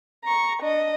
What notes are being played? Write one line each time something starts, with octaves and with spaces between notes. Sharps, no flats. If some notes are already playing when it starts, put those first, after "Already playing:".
A#5 C#6
D4 D#5